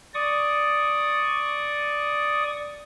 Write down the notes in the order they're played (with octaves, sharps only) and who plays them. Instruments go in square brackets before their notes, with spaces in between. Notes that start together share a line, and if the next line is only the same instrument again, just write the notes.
[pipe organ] D5 C#6 D#6